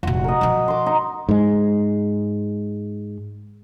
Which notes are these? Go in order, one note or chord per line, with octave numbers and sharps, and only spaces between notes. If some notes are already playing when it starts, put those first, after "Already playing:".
F1 A#2 F#4
A#4 D#5
B2 F3
C6 D6
D#4
G#2 G#3